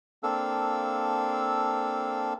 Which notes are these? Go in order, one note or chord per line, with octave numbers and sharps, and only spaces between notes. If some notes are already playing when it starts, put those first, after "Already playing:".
A#3 C4 D4 A4 F5 E6